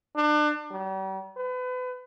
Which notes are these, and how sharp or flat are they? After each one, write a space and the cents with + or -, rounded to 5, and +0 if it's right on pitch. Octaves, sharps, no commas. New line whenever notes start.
D4 +35
G3 -40
B4 +35